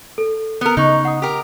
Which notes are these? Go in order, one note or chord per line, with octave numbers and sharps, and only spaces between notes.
A4
B3 A#4
C#3 D#4 D#5 C#6
F#5 D#6
G4 A#4